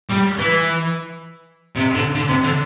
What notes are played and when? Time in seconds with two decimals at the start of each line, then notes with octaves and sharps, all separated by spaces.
0.11 G3
0.39 E3
1.76 C3
1.95 D3
2.15 D3
2.29 C3
2.44 D3